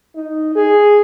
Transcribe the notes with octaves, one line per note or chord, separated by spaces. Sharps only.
D#4
G#4